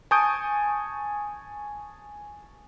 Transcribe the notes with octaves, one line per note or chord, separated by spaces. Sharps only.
G#5 A5 C#6 D#6 G6 D7